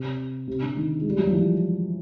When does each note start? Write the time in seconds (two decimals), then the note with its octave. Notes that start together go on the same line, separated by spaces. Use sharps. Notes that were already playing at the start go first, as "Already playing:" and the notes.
Already playing: C3
0.48 C3
0.62 D3
0.77 D#3
1.01 G#3
1.10 G3
1.18 F#3
1.26 F3
1.33 E3